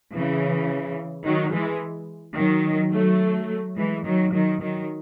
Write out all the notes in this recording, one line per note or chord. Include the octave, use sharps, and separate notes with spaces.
C#3 E3
D#3 F#3
E3 G#3
D#3 F#3
F#3 A3
E3 G#3
D#3 F#3
D#3 F#3
D#3 F#3